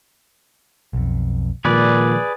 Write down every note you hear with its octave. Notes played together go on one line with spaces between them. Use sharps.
B1 F2
A#2 D#3 F3 G#3 G#4 B4 D5